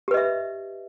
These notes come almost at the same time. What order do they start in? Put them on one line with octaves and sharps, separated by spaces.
G4 B4 D#5 E5